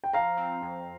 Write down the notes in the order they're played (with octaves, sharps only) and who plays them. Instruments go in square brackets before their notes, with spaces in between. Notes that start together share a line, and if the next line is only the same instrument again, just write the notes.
[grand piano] G5
[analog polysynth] F3 [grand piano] F5 A#5
[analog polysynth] C4
F2